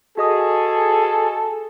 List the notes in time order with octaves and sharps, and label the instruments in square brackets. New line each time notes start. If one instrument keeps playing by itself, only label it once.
[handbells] F#4 D#5 D#6 [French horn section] G#4 [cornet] A4